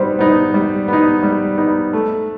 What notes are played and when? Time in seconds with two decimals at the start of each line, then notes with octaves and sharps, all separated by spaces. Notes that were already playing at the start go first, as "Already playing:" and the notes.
Already playing: G3 B3 D#4 C5
0.19 B3 D#4
0.54 G3
0.88 B3 D#4
1.23 G3
1.58 B3 D#4
1.93 A3